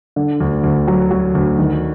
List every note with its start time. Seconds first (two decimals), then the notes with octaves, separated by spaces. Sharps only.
0.16 D3
0.40 D2
0.64 D2
0.88 F#3
1.11 F#3
1.35 D2
1.59 D#3